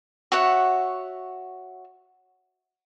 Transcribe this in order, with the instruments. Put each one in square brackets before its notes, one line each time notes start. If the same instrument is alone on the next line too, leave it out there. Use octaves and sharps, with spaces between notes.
[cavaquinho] F#4 C#5 E5 F#5